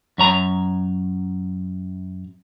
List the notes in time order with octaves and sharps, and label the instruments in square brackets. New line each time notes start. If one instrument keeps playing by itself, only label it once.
[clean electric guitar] F#2 C#5 A#5